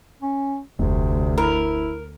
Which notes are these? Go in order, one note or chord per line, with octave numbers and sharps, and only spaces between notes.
C#4
F1 D2 C3
E4 A#4